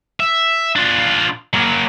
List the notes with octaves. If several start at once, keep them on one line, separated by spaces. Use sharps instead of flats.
E5
D4 F4
F#3 A#3